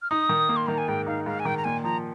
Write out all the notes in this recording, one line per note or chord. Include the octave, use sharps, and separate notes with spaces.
F6
D#4 D#6
D#3
A#3
C6
D#3 A#5
G#5
G#2 G5
D#4 F5
G#2 F5
G#5
D#3 G5
A#5
A#2 G#5
F3 A#5